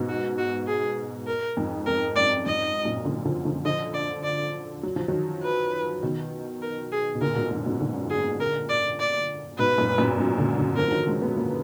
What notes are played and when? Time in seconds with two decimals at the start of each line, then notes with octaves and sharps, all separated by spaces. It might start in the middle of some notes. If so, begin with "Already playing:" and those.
Already playing: G#2 B2
0.09 F#4
0.38 F#4
0.67 G#4
1.27 A#4
1.57 F2 G#2
1.86 F2 A#4
2.16 F#2 D5
2.45 F2 G#2 D#5
2.85 F#2 A#2
3.05 A#2 D3
3.25 D3 F3
3.45 D3 F3
3.65 D3 F3 D#5
3.94 D5
4.24 D5
4.83 F#3
4.96 F3
5.08 D#3 F#3
5.43 B4
6.03 B2 D#3
6.62 A#4
6.92 G#4
7.15 B2
7.21 A#2 D3 A#4
7.35 G#2 B2
7.51 F#2 A#2
7.66 G#2 B2
7.80 A#2 D3
8.10 G#4
8.40 A#4
8.69 D5
9.00 D5
9.59 G#2 B2 B4
9.78 F#2 A#2
9.98 F#2 A#2
10.18 G#2 B2
10.38 A#2 D3
10.58 A#2 D3
10.77 D3 F3 A#4
10.88 F3
10.92 D#3 F#3
11.07 F3 G#3
11.22 G#3 B3
11.37 F#3 A#3